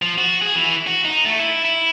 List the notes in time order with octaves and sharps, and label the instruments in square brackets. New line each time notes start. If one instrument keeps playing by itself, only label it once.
[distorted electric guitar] F3
F#4
G#4
E3
F#4
D#4
A3
E4
E4